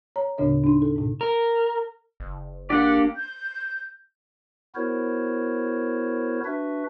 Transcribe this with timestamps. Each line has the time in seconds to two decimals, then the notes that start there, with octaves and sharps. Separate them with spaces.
0.16 C#5 A#5
0.38 D2 A2 C#3 D4 C#5 D#5
0.64 D4 D#4
0.82 A4
0.96 G#2 B2
1.21 A#4
2.20 F#1
2.70 A#3 D4 G4 D5 F#5
3.17 G6
4.75 B3 E4 F#4 A#4 C5 C#5
6.45 D4 F#4 B4 E5